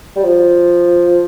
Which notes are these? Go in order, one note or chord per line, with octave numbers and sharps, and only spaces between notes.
G3
F3